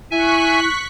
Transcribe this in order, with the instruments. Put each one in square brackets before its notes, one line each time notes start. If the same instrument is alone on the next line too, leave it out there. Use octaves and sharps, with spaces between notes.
[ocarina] E4 [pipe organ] E5 G#5 [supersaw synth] C#6 F#6 B6